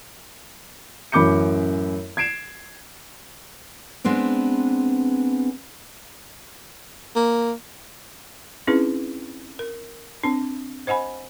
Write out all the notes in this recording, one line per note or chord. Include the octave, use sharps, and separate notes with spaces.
A1 F#2 B5 D6 G6 C#7
G#6 C7 D7 E7
G#3 B3 C4 D4
A#3
C4 C#4 D#4 E4 G#4 B4
A#4
C4 D4
C5 D#5 F#5 G#5 B5